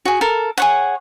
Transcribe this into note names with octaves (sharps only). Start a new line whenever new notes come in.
F#4 G#4
A4 A#4
G#4 C#5 F#5